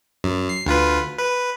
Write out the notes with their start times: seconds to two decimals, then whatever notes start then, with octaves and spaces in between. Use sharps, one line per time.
0.24 F#2
0.49 C7
0.66 D2 F4 B4
1.18 B4